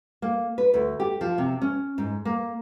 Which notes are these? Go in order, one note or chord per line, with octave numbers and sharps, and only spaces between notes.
A#3
B4
D2
G4
F3
C3
C#4
G#2
A#3